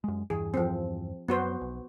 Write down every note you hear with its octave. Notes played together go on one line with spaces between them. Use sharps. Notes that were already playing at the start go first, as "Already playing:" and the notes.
F#2 G#3
E2 G2 E3 G#4
F3 C4
F#2 B3 F#4 C5
B1